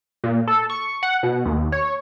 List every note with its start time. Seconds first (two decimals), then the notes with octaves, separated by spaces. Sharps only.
0.24 A#2
0.48 A4
0.70 C#6
1.03 F#5
1.23 B2
1.45 D#2
1.72 C#5